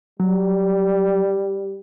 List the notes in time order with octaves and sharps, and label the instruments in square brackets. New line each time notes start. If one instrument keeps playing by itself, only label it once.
[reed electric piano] F#3 [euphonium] G3